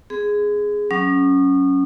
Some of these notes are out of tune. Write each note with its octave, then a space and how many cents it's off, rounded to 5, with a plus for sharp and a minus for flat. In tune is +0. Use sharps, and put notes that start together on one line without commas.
C4 -40 G#4 +0
F#3 +0 C#4 +0 D#6 -40